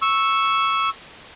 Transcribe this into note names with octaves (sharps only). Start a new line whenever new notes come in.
C#6 E6